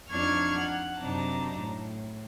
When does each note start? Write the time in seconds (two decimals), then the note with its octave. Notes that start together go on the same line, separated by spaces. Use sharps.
0.10 F2 D4 D#4 C#6 F6 G#6
0.59 F#5
0.99 F#2 C3 D4 D#4 A5 A#5
1.59 A2